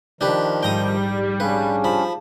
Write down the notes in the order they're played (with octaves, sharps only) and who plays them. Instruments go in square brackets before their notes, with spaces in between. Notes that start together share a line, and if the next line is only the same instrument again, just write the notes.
[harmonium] D#3 F3 [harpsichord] D4 G4 B4
[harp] A#1 G#2 [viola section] G3 [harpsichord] G5 A#5 D#6
[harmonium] C#4 D4 [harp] G#4 F5 [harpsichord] B4
[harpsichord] F3 B5 [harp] A5